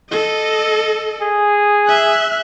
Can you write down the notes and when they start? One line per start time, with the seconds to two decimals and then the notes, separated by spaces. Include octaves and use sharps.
0.11 A4 D#5
1.22 G#4
1.88 E5 F#6